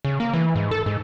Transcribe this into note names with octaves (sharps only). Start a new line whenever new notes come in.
C#3
A#3
E3
G#2
A4
G#2